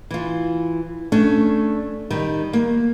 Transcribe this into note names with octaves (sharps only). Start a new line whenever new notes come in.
E3 F4
A3 C#4 D4
D#3 G3
A#3